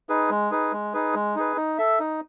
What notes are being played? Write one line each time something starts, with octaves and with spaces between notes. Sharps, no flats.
D#4 G#4 B4
G#3
D#4 G#4 B4
G#3
D#4 G#4 B4
G#3
D#4 G#4 B4
D#4
A4 E5
D#4